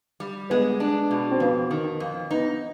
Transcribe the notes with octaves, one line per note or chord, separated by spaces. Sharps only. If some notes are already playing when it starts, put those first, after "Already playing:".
G3
G#3 B3
D4
B2
C4
F2 B3
D#3
F2
B3 D#4